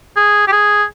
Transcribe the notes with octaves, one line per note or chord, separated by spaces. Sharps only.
G#4
G4
G#4